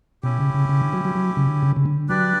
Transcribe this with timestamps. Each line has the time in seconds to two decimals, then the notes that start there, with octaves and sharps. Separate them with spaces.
0.23 B2 C#4 E4 G4
0.39 C#3
0.54 C#3
0.69 C#3
0.81 D3
0.93 F#3
1.05 F#3
1.15 F#3
1.37 C#3
1.47 D3
1.62 C#3
1.76 C#3
1.86 D3
2.09 F#3 D4 G4 B4 D5